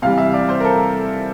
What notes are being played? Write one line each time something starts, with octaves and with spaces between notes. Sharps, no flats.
C3 E3 G3 F5
E5
D5
C5
A#4
A4